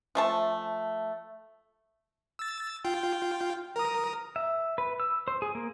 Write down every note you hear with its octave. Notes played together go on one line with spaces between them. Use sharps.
F3 A3 A5
E6 A6
F4 G5
A#4 A#5 D#6
E5
B4
E6
C5
G#4
A#3